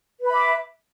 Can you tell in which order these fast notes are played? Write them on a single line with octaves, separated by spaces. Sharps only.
B4 B5 E5 D6